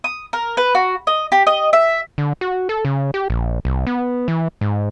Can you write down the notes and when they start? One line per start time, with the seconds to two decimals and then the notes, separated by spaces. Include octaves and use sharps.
0.04 D#6
0.33 A#4
0.57 B4
0.75 F#4
1.07 D#5
1.32 G4
1.47 D#5
1.73 E5
2.18 D3
2.41 F#4
2.69 A4
2.85 C#3
3.14 G4
3.30 A#1
3.65 C2
3.87 B3
4.28 E3
4.61 G#2